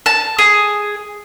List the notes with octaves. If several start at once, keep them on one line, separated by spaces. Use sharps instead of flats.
A5
G#4